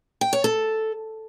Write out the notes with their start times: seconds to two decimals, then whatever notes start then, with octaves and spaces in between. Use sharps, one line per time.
0.21 G5
0.33 C#5
0.44 A4